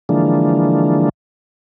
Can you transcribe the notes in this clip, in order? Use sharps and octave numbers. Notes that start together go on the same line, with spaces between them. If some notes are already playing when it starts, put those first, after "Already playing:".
D3 E3 F3 G#3 A#3 D4